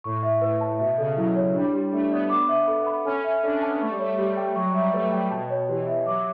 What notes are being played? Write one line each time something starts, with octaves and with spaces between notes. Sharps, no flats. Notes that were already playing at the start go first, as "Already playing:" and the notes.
A2 C#6
E5
A2 B4
A5
B2 E5
C#3 A4
F#3 E4
C#5
G3 D4
G4
A3 D4
B3 D5
D6
E5
A4
B5
C#4 A4
E5
D4 A4
C#4
A5
B3
A3 C#6
G3
A3 C#5
G3 G4
G5
F#3 C#6
G3
E5
G3
A3 B4
G3 G5
B2 A5
C#5
E3 G4
E5
F#3 D6